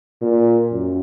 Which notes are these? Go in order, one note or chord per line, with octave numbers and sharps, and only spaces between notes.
A#2
F#2